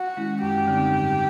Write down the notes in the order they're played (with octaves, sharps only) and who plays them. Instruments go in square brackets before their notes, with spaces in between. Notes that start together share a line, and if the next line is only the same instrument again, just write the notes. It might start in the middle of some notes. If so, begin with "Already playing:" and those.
Already playing: [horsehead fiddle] F#4
[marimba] D#3 G#3 C#4 E4
[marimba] F#2 [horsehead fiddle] G4
[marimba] D3 G3 C4 D#4
G#2